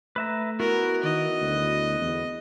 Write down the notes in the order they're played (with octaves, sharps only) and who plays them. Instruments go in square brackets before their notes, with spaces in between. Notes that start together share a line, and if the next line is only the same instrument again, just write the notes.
[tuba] A3 [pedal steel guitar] B4 E5 A#5
[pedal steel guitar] B3 E4 F#4 [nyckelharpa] A#4
[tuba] D#3 [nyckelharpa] D#5
[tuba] D2
E2